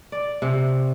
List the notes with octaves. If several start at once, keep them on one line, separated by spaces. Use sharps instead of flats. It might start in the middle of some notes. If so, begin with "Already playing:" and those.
D5
C3